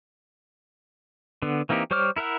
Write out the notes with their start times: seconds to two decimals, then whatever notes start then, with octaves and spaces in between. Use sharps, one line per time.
1.42 D3 B3
1.69 E3 A#3 C4 D#4 G4
1.91 G3 C5 C#5 D6 F6
2.16 E4 A#4 E5 F#5